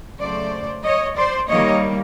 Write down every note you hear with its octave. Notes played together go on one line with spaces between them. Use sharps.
C#3 F#3 A3 C5 D5
C#5 D#5
C5 D5
D#3 G3 A#3 C#5 D#5